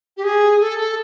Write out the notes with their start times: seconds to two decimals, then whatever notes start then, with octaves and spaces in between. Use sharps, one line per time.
0.17 G4
0.23 G#4
0.60 A4
0.78 A4